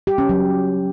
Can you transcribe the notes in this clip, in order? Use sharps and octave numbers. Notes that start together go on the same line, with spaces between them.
G4
C#4
F#3